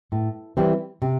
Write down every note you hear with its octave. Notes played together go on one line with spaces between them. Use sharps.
A2
E3 G3 C4 E4
C3